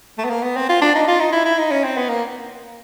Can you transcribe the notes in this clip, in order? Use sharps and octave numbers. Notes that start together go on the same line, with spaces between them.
A3
B3
A#3
B3
C4
F4
D4
D#4
F4
D#4
E4
E4
D#4
C#4
C4
B3
A#3